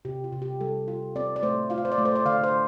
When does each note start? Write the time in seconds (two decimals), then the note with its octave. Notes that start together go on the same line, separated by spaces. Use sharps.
0.05 C3 G4
0.24 F4
0.33 C3
0.42 G4
0.60 G3 A4
0.88 F4
1.16 C4 D5
1.36 D5
1.43 A3 C5
1.70 F4 F5
1.78 D5
1.85 C5
1.92 D5
1.98 A3
2.05 C5
2.15 D5
2.25 D3 F5
2.44 C5